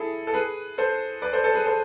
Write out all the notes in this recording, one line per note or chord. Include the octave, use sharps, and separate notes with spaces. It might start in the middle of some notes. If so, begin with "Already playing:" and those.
Already playing: E4 G#4 A4
A4
G#4 B4
A4 C5
B4 D5
A4 C5
A4 C5
G#4 B4
A4 C5